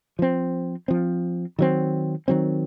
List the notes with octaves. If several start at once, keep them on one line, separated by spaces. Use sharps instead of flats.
F3 C4
F3 C4
D#3 F#3 C4
D#3 F#3 C4